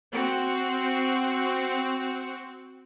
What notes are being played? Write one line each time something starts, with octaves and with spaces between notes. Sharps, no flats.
C4 F#4